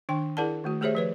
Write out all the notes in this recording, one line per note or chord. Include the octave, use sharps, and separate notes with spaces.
D#3 D4 G5
E4 G#4 A#4 D5 F#5 A5
D#3 A3 F#4
A3 G4 G#4 C5 C#5 E5
F3 B4 C#5